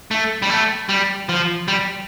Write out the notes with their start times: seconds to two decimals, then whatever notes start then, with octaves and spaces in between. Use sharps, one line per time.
0.11 A3
0.42 G3
0.50 A3
0.89 G3
1.29 F3
1.68 G3